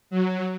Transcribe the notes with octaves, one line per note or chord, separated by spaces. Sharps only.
F#3